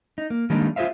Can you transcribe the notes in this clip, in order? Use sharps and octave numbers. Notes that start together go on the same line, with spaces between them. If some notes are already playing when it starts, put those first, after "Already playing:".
D#4
A#3
D#3 G3 G#3 A#3 D4 D#4
F4 G#4 C5 E5 F5